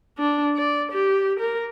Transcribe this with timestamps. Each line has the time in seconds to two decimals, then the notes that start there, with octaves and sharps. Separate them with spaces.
0.18 D4
0.57 D5
0.92 G4
1.40 A#4